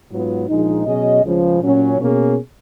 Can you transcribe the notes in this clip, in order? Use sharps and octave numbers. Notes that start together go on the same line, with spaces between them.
G#2 F#3 B3 F4
A#1 A#2 F3 G#3 D#4
B2 F#3 C#4 G#4 D#5
C#2 C#3 F3
A#2 F#3 C#4
B2 A#3 C#4 G#4